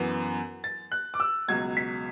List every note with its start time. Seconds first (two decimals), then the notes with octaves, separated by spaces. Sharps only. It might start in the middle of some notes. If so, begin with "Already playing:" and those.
Already playing: F#2 E3 B3
0.64 A6
0.92 F#6
1.14 D6
1.20 E6
1.48 C#2 B2 F#3 G#6
1.77 B6